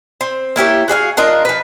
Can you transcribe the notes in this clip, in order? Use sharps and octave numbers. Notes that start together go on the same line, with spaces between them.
C4
A#3 E4 G4 C#5
F#4 G#4 D5 F5
D4 F4 A#4 D#5
F3 B4